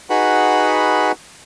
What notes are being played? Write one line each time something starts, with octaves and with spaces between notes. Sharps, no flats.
D#4 F#4 G#4 B4 F#5 B5